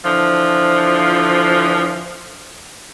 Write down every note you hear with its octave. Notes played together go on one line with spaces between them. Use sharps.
D3 E3 F3